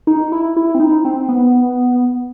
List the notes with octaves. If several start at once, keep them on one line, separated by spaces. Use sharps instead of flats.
D#4
E4
E4
C4
D#4
C4
B3